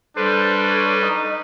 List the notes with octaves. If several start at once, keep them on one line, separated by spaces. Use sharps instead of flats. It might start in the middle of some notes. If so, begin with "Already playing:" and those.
G3 D4 A4 B4 C5
C#5
D#4